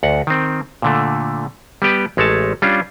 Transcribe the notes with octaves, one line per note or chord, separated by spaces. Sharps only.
D2 F#5
D#3 C4
A#2 D3 A3
G3 B3 G4 B4
A1 G#3 A3 C#5 A5
G3 C#4 D4 F4